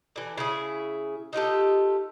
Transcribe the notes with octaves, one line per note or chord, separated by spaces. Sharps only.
D3 E3
C#3 E4 G#4
D#4 F4 G4 A4